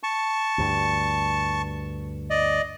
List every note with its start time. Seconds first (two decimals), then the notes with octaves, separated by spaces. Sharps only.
0.03 A5 C#6
0.58 D2 G2
2.30 D5 D#5